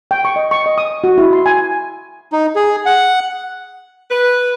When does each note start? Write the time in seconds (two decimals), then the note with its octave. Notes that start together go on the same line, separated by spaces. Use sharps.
0.11 G5
0.25 C#6
0.36 D#5
0.51 C#6
0.66 D#5
0.78 D#6
1.04 F#4
1.18 E4
1.33 C6
1.46 G#5
2.32 D#4
2.56 G#4
2.86 F#5
4.10 B4